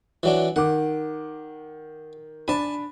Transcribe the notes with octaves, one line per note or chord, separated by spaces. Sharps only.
E3 F#3 D4
D#3 F#5 D6
D4 G#5 A5 B5